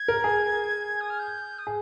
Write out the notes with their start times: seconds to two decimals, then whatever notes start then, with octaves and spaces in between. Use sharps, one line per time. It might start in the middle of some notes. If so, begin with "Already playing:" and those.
Already playing: G#6
0.08 A#4
0.24 G#4
1.00 D#6
1.09 F6
1.19 G6
1.58 D#6
1.67 G#4